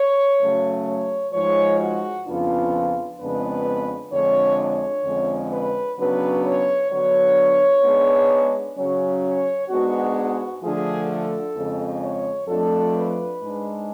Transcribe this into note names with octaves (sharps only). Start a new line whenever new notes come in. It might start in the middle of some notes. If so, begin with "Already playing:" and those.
Already playing: C#5
C#3 F#3 A3
C#5
G#2 F3 G#3 C#5
F#4
F2 C#3 F3 B3 D4 F4
F2 C#3 G#3 B3 D4 B4
F2 D3 G#3 D4 C#5
C#5
F2 D3 G#3 C#4
B4
C#3 F#3 B3 D4 B4
C#5
D3 F#3 B3 D4 C#5
G#2 G#3 B3 D4
C#3 F#3 C#4 C#5
C#5
G#2 G#3 B3 D4 F#4
F#4
D3 F3 A3 G#4
A4
F2 C#3 G#3
C#5
F2 F3 A3 D4 A4
B4
G#2 G#3 D4